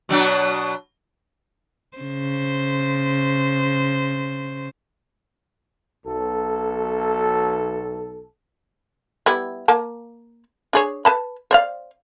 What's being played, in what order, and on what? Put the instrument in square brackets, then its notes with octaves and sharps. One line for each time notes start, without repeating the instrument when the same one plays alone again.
[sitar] B2 F#3 D4
[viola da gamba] C#3 C5
[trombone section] B1 A4
[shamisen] G3 B3 E4
A#3 A5
D4 G#4 C#5
B4 A5 B5
C5 D5 F5